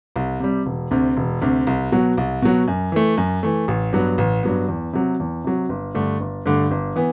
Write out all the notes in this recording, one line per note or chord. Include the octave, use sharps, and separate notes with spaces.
C2
C3 G3
E1
D2 C3
E1
D2 C3
C2
B2 F#3
C2
B2 F#3
F#2
E3 A3
F#2
E3 A3
A1
G2 F#3 B3
A1
G2 F#3 B3
E2
C3 F#3
E2
C3 F#3
G1
G2 D3 A3
G1
G2 D3 A3
G1
E3 B3